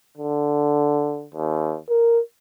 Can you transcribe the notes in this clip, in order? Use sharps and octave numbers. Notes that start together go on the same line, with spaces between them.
D3
D#2
A#4